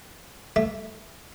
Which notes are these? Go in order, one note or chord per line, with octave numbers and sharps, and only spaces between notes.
A3